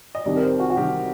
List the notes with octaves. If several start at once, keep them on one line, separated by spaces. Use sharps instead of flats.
D#5
C2 C3 D#3 D5
A#4
C5
F#4
F#4
C2 C3 D#3 G4